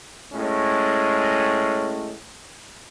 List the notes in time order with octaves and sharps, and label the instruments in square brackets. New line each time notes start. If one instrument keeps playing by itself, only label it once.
[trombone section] A2 G#3 C#4